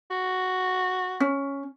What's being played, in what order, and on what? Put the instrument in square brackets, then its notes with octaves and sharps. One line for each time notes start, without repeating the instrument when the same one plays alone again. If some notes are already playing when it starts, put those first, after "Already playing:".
[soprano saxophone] F#4
[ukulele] C#4